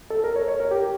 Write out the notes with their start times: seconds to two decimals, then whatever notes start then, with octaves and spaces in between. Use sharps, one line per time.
0.10 A4
0.24 A#4
0.36 C#5
0.48 C#5
0.60 A#4
0.71 G4